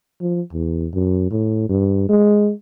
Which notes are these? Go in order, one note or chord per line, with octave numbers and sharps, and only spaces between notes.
F3
E2
F#2
A2
G2
G#3